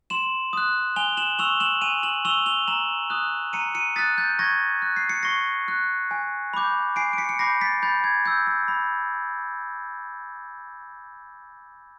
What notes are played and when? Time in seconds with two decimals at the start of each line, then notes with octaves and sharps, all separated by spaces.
0.10 C6 E7 F#7
0.53 D#6 F#6
0.96 G#5 F7 G7
1.17 E7 F#7
1.39 C#6 E6 F7 G7
1.60 E7 F#7
1.81 G#5 D#7 F7
2.03 E7 F#7
2.25 C#6 E6 F7 G7
2.46 F7 G7
2.68 A#5 E7 F#7
3.10 D#6 F#6
3.53 A#5 C#7 D#7
3.75 C#7 D#7
3.96 D#6 F#6 A6 B6
4.18 G6 A6
4.39 C#6 G#6 A#6
4.82 F#6
4.96 C7
5.09 C#7
5.23 C#6 A#6 C7
5.68 F#6
6.11 G#5
6.54 B5 D6 G6
6.96 G#5 C7 D7
7.13 D7
7.18 B6 C#7
7.29 C#7
7.39 B5 D6 G6 A#6 C7
7.61 A6 B6
7.82 B5 G6 A6
8.04 G#6
8.26 E6 G6
8.47 G6
8.68 B5